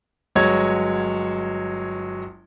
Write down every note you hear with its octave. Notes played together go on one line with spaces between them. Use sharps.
G1 F#3 G#3 C#5 G#6